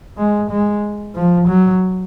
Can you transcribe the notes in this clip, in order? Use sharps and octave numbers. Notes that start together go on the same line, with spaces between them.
G#3
G#3
F3
F#3